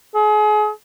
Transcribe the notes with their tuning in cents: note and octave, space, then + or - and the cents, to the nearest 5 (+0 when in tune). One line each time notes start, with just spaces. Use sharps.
G#4 +35